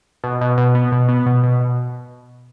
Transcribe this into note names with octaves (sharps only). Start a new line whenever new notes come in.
B2
B2
B2
B3
B2
B3
B2
B2
B2